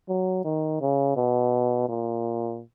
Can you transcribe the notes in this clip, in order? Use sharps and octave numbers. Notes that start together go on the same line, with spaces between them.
F#3
D#3
C#3
B2
A#2